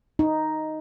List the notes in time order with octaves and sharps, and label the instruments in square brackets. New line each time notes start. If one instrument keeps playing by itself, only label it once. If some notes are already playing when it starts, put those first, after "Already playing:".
[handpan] D#4